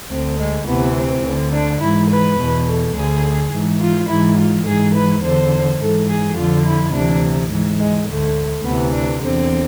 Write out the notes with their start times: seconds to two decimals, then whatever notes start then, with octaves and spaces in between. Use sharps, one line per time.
0.10 D2 D3 C4
0.39 G#3
0.67 D2 C3 E3 B3
0.95 C4
1.24 D2 D3
1.52 D4
1.81 G#2 E3 E4
2.10 B4
2.39 E2 B2
2.67 A4
2.95 D2 D3 G#4
3.52 G#2 E3
3.80 F4
4.08 G#2 E3 E4
4.38 F4
4.65 G#2 E3 G#4
4.94 B4
5.22 E2 D3 C5
5.80 G#2 E3 A4
6.08 G#4
6.36 F2 D3 F4
6.65 E4
6.93 D2 C3 E3 D4
7.51 G#2 E3
7.79 G#3
8.07 D2 D3 A3
8.64 D2 C3 E3 B3
8.93 D4
9.21 E2 D3 C4